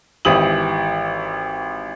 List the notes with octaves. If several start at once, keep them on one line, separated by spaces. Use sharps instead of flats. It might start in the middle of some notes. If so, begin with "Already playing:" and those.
G#1 E3 G4 D#6 F#7